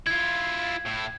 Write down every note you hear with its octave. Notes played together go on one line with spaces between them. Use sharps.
E4 F4 G#6
A2 E4